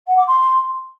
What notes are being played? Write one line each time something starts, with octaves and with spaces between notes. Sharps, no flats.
F#5
D6
C6